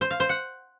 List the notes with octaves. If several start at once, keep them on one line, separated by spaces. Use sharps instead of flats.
C5
F5
C5
F#5